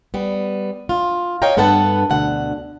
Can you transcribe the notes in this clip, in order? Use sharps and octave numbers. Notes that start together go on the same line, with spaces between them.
G3 B3
F4
C#5 D#5 F5 G5 A#5
G2 B3 A4 B4 F#5 A5
D2 B2 D3 F#5